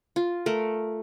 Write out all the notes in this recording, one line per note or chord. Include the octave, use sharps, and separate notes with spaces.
F4
A3 A#4